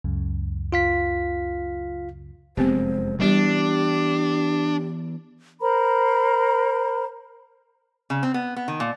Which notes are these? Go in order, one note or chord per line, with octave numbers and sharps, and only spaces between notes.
C#2 F#2 C#3
F4 F5 B6
F1 F#2 G#3 B3 C4 G4 C5
E3 G3 B3 D4 G4
A#4 C5 A#5 B5
C#3
C4
B3
B3
D#3
A#2